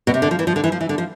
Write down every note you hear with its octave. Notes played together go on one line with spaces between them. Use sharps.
B2
C3
D3
F3
E3
F3
D3
E3
F3
E3
D3
F3